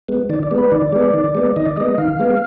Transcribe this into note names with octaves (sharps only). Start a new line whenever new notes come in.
G#3 B3
D#3 D5
D5
G#3 B3
B4
D#3 D5
G#3 B3
D#3
G#3 B3
D#3 D#5
D5
G#3 B3 D#5
D#3 F5
G#3 B3